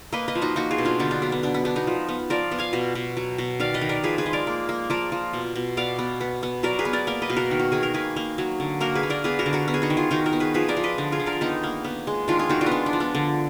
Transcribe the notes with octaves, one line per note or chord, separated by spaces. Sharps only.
A#3 B4 D#5
B4 D#5
F3
D#4 F#4
A#3 D#4 F#4
F4 G#4
B2
D4 F4
D3 B3 D#4
D4
F#3 B3
B3
B3 D4
B3
B3 D4
B3 D#4
F3
B3
F3 A#4 D5
B3
F5 G#5
B2
B2
F#3
B2
D#3 D5 F5
B4 D#5
D#3
A#4 D5
F3 G#4 B4
G#4 B4
G#3
A#4 D5
A#3
A#3
F3 A#4 D5
F3
B2
B2
B3 D5 F5
B3
B3
B3
F#3 A#4 D5
G#4 B4
B3
A#4 D5
A#3 A#4 D5
B4 D#5
B2
F#4 A#4
D#3
F#4
D#3 G#4
A#4
A#3 G#4 B4
A#3
F#3
D3
A#3 F#4 A#4
G#4 B4
A#3
A#4 D5
B3 G#4 B4
F#4 A#4
D3
F#4 A#4
B3
G#4
D#4 F#4
D#3
F4 G#4
D#3 D#4 F#4
F#4 A#4
B3
G#4 B4
F3 G#4 B4
A#4 D5
F3
B4 D#5
D3
F4 G#4
D3
A#4 D5
D#3 B3 D#4
A#3
B3
G#3
D#3 D4 F4
F4 G#4
D#3 D#4 F#4
D4 F4
B3
G#3 D4
D4
F3
B3
D3